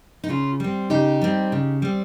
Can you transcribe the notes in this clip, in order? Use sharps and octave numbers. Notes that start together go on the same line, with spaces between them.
D#4
C#3 C#4 F4
G3 C4
C#3 D#4 G4
G3 C4
C#3
G3 C4